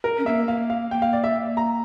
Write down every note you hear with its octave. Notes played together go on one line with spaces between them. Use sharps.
A#4
C#4
A#3 E5
A#3 F5
F5
A#3 G5
F5
D5
E5
A#5